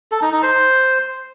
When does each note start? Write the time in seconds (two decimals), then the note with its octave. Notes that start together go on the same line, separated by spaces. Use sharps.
0.12 A4
0.22 D#4
0.32 D#4
0.43 C5